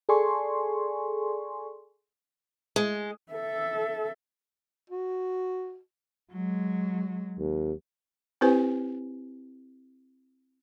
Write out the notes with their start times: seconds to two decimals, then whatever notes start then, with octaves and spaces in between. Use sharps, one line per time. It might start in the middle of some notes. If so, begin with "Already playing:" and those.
0.09 G#4 A4 D5 G#5 C6 C#6
2.76 G#3
3.33 A4 E5
4.90 F#4
6.32 F#3 G#3
7.39 D#2
8.41 C4 E4 G4 B4 C5 G#5